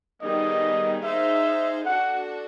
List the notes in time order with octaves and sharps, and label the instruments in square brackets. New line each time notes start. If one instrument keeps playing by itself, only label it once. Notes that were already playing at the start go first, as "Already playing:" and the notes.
[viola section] D#3 G3 B3 D#4 G#4 [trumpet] D#5
[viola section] D#4 G#4 C5 F5 [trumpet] E5
[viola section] D4 F#4 A4 [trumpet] F#5